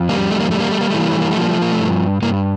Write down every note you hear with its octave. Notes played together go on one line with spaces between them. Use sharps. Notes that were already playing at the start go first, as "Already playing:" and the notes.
Already playing: F2
G3 A#3
A3
A#3
G3 A3
A#3
A3
A#3
E3 A3
A#3
A3
A#3
A3
F3 A#3
A3
A#3
A3
G2
G2 A#3